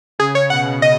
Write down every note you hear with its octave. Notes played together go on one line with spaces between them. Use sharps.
C#3 G#4
C#5
B2 F#5
D#5